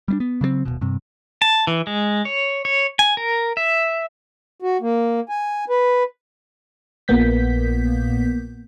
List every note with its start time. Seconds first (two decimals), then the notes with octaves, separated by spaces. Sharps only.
0.08 G3 A3 D4
0.20 B3
0.41 C#3 F#3 G3 C4
0.65 D#1 A#1 B2
0.81 G2 C3
1.42 A5
1.67 E3
1.87 G#3
2.25 C#5
2.65 C#5
2.99 G#5
3.17 A#4
3.57 E5
4.62 F#4
4.81 A#3
5.29 G#5
5.70 B4
7.08 A#1 A#2 A#3 B3 G6 B6